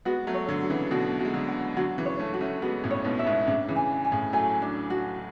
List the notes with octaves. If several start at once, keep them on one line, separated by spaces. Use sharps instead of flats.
G#3 B3 F#4
F#3 A3
C#5
D3 F#3
F#4
C#3 E3
B2 D3 F#4
G#3 F#4
D3 F#3
F#5
D3 F#3 F#4
C#3 E3
C#5
A3 C#4
F#4
A3 C#4
G#3 B3 F#4
A2 C#3
C#5
G#2 B2
E5
G#2 B2
A2 C#3 D4
C#3 E3
G#5
G#5
A2 C#3
F#3 A3 G#5
D4
F#4